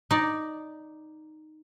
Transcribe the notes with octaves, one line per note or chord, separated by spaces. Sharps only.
D#4 D5